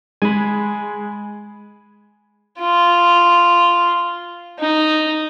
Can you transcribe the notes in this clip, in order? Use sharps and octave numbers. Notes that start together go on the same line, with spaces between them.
G#3 G#5 B5
F4
D#4